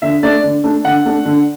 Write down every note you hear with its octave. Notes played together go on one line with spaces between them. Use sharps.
D3 E5
A3 D4 D5
D3
A3 D4
D3 F#5
A3 D4
D3